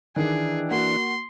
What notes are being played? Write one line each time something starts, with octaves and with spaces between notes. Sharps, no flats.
D#3 E3 D4 G#4
A#3 F#4 C6